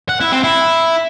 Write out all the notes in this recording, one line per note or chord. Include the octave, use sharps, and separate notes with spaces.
F#5
E4
C4
E4